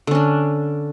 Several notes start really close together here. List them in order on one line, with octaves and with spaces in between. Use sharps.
D3 C#4 D4